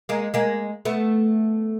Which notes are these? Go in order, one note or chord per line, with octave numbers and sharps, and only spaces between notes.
G#3 A#3
G#3 A#3
A3 B3